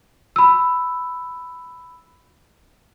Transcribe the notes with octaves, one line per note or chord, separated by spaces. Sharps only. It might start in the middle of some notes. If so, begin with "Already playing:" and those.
B5 E6